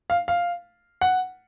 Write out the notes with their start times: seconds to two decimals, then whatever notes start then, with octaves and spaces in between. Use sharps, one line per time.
0.10 F5
0.28 F5
1.01 F#5